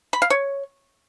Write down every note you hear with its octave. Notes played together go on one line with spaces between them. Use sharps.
B5
F5
C#5